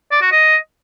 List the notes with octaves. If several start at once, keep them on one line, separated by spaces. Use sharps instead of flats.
D5
F#4
D#5